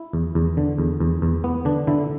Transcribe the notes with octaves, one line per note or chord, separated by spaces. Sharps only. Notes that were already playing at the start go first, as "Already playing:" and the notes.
Already playing: E4
E2
E2
D3
E2
E2
E2
B3
D3 D4
D3 E4